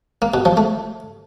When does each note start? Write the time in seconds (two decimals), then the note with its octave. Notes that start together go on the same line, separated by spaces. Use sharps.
0.22 A#3
0.34 B2
0.45 F3
0.57 A3